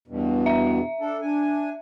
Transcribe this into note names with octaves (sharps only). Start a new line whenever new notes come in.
E2 G2 B2
E5
D4 A4
D4 G#5